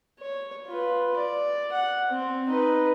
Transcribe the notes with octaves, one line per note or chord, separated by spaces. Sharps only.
C#5
F4 B4
D5
F#5
C4
D#4 B4